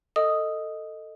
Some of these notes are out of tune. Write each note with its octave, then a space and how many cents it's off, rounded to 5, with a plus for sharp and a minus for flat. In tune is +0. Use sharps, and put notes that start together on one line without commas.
A4 +20 D#5 +0 D#6 +0